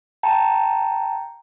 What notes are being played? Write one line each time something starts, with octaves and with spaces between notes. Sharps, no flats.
G5 A5 A#5